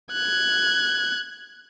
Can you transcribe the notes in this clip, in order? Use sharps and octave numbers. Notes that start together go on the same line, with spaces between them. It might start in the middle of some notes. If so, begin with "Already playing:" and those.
F#6 G#6